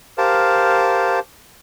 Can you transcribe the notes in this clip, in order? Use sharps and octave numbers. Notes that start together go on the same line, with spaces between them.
G4 A#4 C5 F5 A5